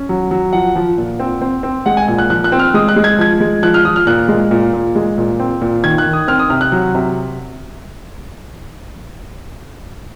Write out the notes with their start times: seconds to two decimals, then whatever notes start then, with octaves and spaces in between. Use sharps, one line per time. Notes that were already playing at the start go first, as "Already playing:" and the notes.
Already playing: C#4
0.09 F#3
0.31 F#3
0.53 F3 F#5
0.75 F3
0.98 A#2
1.20 C4
1.42 C4
1.63 C4
1.86 G#3 F#5
1.97 G#5
2.08 A#2 G#5
2.19 F#6
2.30 F3 F#6
2.44 F#6
2.52 C4
2.59 F6
2.74 G#3 D#6
2.88 F#6
2.96 G#3
3.04 G#6
3.18 F3 G#6
3.40 G#3
3.63 F3 F#6
3.74 F6
3.85 F3 D#6
3.96 F6
4.07 A#2 F#6
4.28 G#3
4.51 A#2
4.73 A#2
4.95 G#3
5.18 A#2
5.40 C4
5.61 A#2
5.84 D#3 G#6
5.98 F#6
6.06 D#3
6.13 D#6
6.28 C4 F6
6.39 D#6
6.50 C3 F6
6.61 F#6
6.72 F#3
6.95 C3